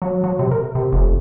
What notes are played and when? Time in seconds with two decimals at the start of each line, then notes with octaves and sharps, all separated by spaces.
0.02 F#3
0.24 F#3
0.39 C3
0.51 A#4
0.75 C3
0.93 F1